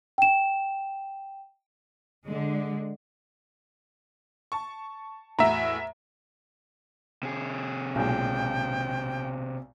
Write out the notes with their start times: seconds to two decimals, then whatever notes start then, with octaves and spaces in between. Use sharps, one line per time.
0.18 G5 E7
2.24 D3 G#3
4.52 A5 C#6
5.39 E2 A2 F#4 E5 A#5
7.23 C3 G#4
7.95 B1 A#2 G#3 G5